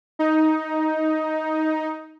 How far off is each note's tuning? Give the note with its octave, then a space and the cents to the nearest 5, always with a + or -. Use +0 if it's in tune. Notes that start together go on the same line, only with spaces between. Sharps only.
D#4 +10